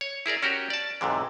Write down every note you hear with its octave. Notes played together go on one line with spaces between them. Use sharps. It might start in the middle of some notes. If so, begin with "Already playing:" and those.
C#5
E4 G#4 A#4 D5
C#4 F#4 G4 A#4
D5 A5
B1 G#2 C3 E3